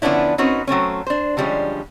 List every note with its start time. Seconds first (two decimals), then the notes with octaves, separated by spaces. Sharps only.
0.02 D3 F3 B3 C#4 D4 E4
0.38 C4 C#4 D#4 F#4 B4
0.67 F#3 A3 C4 C#4
1.07 D4 C5
1.37 D3 F3 G3 G#3 C#4